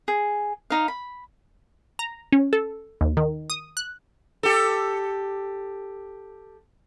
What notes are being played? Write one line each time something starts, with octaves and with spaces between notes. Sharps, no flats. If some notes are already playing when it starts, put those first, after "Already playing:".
G#4
D#4 F5
B5
A#5
C#4
A4
D#2
D#3
D#6
F#6
G4 A4